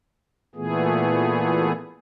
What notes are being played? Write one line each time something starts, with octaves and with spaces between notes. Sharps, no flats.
A#2 E3 A3 B3 G#4